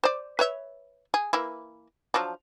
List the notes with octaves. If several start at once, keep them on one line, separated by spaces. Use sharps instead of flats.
C5 D5
B4 C#5 E5
G#4
E3 A#3 E4
F3 F#3 D4